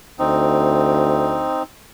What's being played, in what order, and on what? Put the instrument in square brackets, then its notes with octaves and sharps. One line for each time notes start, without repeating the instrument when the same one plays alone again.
[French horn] D2 [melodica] C4 D#4